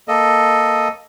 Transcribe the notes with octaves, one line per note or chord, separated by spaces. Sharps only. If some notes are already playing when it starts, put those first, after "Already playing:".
A#3 A4 D#5